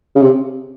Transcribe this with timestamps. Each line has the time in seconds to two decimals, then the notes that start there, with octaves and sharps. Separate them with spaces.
0.16 C#3
0.22 C3